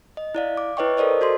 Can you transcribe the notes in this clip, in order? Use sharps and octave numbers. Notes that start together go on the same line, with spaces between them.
D#5
E4 D5 F5
D6
E4 B4 C#5 D#5 G5 C#6
A4 A#4 C5 D5 D#5
F#4 A4 C5 C6